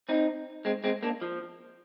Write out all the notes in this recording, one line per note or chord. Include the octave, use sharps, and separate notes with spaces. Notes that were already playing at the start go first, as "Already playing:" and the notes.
C4 D#4
G#3 C4
G#3 C4
A#3 D4
F3